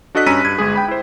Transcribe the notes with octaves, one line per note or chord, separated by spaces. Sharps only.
D4 F#4 A4 D#5 F#6 B6
G2 C#4 A#5 E6 B6 D#7
G2 G#6
G1 G#3 G#4
G5 B5
E4 C5